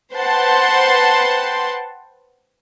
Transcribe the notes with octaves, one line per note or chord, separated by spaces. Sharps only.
B4 C5 F#5 G5 A5 C6